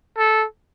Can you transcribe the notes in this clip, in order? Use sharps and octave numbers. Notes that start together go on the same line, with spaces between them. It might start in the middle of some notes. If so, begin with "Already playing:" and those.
A4